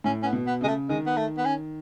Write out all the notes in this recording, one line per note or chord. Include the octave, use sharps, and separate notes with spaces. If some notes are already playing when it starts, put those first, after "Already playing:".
A2 C#4
C#4
B3
B2
B3
C#3 G#3
A3
D#3 G#3
B3
A3
B3
C#4